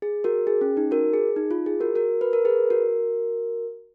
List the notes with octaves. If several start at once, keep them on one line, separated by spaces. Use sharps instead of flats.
G#4
F#4 A#4
G#4
C#4
D#4
F#4 A#4
G#4
D#4
F4
G#4
F#4 A#4
F#4 A#4
B4
A#4
G#4 B4
F#4 A#4